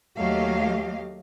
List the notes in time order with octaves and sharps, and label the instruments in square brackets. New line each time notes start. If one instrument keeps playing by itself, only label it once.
[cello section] D#2 F#3 A3 G4 D#5 F5